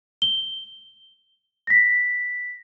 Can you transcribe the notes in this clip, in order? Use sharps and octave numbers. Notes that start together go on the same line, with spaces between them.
G7
A#6 B6